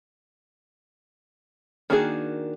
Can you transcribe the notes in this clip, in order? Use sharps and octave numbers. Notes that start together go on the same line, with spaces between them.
D#3 A#3 D4 F#4 G#4